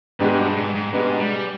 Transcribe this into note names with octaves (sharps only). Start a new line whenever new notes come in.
G#2 B2 G#3 D4 G4 B4
G2
G#2
G#2
G#2 B2 G#3 D4 G4 B4
G3